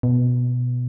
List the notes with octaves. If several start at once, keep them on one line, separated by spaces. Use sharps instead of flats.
B2